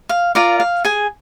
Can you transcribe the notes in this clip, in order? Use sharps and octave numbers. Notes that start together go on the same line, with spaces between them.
F5
F4 A#4 D5 F5
F5
G#4 G#5